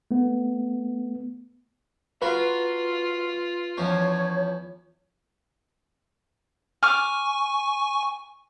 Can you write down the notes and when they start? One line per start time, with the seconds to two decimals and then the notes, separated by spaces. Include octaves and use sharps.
0.11 A3 B3
2.22 F4 F#4 A#4 B4
3.78 E2 F3 C#4 C#5
6.83 G#5 C#6 D6 F6